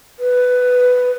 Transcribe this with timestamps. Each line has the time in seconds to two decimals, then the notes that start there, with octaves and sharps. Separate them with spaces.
0.19 B4